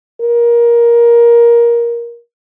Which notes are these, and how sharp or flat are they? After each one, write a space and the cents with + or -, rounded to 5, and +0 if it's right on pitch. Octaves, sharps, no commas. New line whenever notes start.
A#4 +15